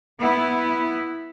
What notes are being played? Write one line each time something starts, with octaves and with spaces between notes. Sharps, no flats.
B3 E4